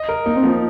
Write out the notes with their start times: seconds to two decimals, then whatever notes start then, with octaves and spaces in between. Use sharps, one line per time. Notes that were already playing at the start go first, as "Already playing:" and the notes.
Already playing: D#5
0.09 A#4
0.26 A#3 D#4
0.36 C4
0.43 F3 A#3